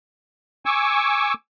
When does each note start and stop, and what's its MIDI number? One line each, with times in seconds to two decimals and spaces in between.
0.66 1.34 80
0.66 1.34 85
0.66 1.34 86
0.66 1.34 88